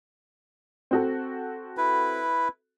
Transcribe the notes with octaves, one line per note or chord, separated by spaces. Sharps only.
C4 F#4 A4
E4 B4